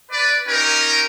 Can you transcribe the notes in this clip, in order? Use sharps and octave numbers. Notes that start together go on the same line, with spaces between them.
B4 D5
C#4 D#4 G4 A#4